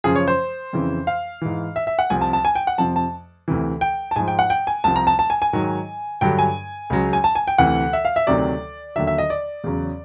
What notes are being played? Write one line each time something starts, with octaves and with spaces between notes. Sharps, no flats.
F#2 C#3 F3 G#4
C#5
C5
F2 C#3 E3
F5
G#2 E3
E5
E5
F#5
C2 C3 F3 G#5
A5
A5
G#5
G5
F#5
F2 C3 F3 A5
A5
D2 C3 E3
G5
A5
G#2 F3 G#5
G5
F#5
G5
G#5
C2 C3 F3 A5
A#5
A5
A5
G#5
G#5
G#2 D#3 F#3
G2 D3 F#3 G5
G#5
C#2 C#3 F#3
G#5
A5
G#5
G5
D2 C3 E3 F#5
E5
F5
E5
D2 C3 D#3 F#3 D5
D#2 D3 F#3 E5
E5
D#5
D5
E2 C#3 F#3